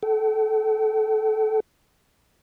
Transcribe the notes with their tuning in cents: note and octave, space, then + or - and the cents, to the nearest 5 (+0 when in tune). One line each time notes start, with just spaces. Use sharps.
A4 -20 G5 -45